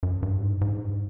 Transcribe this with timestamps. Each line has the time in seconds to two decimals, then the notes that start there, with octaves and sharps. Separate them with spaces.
0.03 F#2
0.23 G2
0.42 G#2
0.61 G#2
0.82 G2